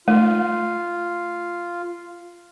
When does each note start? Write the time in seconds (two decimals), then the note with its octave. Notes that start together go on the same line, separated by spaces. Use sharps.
0.08 A3 F4